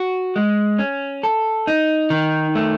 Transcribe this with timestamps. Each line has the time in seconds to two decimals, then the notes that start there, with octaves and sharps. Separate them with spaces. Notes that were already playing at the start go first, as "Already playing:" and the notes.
Already playing: F#4
0.36 G#3
0.78 C#4
1.23 A4
1.67 D#4
2.10 D#3
2.55 A3